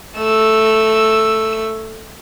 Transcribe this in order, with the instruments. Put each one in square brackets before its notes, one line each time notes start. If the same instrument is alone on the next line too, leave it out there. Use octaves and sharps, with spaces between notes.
[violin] A3 E6